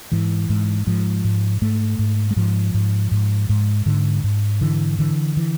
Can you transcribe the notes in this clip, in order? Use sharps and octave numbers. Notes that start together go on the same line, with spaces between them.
G#2 E3
G#2
G#2 F3
G#2
G#2 A3
G#2
G#3
G#2 F3
G#2
G#2
G#2
G#2 D3
G#2
D3 E3
D3 E3
E3